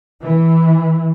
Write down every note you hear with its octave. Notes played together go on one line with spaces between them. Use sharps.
E3